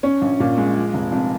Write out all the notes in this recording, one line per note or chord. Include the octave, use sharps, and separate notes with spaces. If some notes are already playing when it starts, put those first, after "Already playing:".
C#4
A#1
A#2
G#3
F3
F1
F2